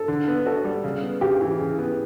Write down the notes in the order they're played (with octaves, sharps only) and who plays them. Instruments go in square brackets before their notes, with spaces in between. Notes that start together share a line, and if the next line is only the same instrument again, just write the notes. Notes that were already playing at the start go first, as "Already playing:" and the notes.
Already playing: [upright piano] A4
[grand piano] D3
B3
[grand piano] F#4 [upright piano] A4
[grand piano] G3
C#3
B3
[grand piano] C#3 [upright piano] G4
[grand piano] E3
C#3
B3